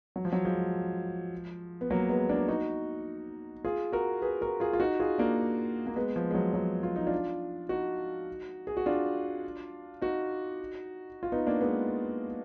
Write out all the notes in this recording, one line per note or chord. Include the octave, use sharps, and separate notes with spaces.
F#3
F3
F#3
F3 G#3
B3
F#3 A#3
G#3 B3
A#3 D4
D#4 F#4
F4 G#4
F#4 A#4
G#4 B4
F#4 A#4
F4 G#4
F4
D#4 F#4
F4 G#4
A#3 D4
A#3
G#3 B3
F3
G#3
F#3
F#3
F4
D#4
D4 F4
D#4 F#4
G#4
F#4
D4 F4
D#4 F#4
F4
B3 D#4
A#3 D4
G#3 B3